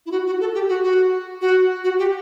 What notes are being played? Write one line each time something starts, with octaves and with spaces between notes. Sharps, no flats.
E4
F#4
F#4
A4
G4
F#4
F#4
F#4
F#4
G4